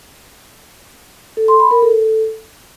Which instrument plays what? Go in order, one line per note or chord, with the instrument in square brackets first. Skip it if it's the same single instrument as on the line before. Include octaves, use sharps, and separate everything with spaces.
[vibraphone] A4
C6
B5
A#4
A4